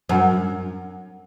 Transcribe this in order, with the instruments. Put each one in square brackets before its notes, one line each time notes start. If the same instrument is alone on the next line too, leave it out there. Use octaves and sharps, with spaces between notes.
[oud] F#2